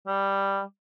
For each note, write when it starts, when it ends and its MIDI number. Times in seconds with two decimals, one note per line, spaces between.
0.07 0.62 55